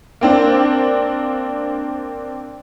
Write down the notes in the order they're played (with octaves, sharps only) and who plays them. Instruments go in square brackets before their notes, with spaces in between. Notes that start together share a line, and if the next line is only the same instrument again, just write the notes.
[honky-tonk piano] A#3 C4 D4